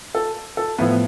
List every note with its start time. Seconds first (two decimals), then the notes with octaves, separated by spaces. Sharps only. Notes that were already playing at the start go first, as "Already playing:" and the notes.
0.15 A4
0.57 A4
0.78 A2 F3 B3 B4